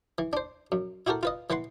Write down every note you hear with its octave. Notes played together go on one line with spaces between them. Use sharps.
E3
D4 C5
F#2
E4 F#4 G4 A4 A#4
F4 B4 D#5
E3 B4 F#5 C6